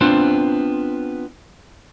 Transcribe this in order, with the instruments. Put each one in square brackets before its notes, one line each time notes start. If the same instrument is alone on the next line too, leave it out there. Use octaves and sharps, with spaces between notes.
[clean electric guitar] B3 C4 D4 F4 C5